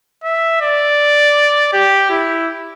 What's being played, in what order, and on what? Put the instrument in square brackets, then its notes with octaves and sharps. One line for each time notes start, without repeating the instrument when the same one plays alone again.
[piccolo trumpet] E5
D5
G4
E4